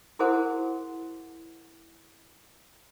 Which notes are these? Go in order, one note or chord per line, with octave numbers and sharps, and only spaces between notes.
E4 F#4 G#4 A#4 C5 F#5